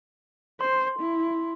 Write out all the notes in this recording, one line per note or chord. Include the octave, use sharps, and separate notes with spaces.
C5 C6
E4